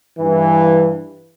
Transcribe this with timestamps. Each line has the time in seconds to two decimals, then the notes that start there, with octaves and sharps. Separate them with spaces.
0.19 G2 E3